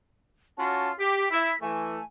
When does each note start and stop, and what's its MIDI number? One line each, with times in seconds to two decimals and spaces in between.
0.58 0.91 61
0.58 0.91 65
0.58 0.91 66
0.58 0.92 81
0.99 1.26 67
0.99 1.61 95
1.31 1.51 64
1.61 1.99 52
1.61 1.99 57
1.61 2.05 80